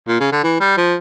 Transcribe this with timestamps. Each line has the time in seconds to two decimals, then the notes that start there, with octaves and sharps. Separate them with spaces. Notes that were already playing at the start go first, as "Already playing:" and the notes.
0.08 A#2
0.20 C#3
0.32 D3
0.44 E3
0.60 G3
0.77 F3